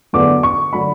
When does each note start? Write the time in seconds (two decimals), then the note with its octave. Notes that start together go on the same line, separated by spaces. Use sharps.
0.13 E2 D3 F#3 D6
0.43 C#6
0.73 D3 F#3 B5